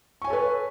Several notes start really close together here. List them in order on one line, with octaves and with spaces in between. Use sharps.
C#6 G#5 C#5 A4 B4